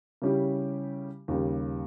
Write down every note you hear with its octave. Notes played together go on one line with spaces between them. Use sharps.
C#3 G3 C#4 E4 G4
D#2 C#3 G3